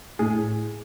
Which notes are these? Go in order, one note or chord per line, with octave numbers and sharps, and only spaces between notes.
A2 G#4